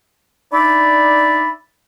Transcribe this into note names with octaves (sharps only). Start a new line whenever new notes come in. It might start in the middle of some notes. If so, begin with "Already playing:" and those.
D4 D#4 D5 E5 B5